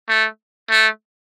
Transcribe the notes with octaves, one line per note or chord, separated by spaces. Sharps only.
A3
A3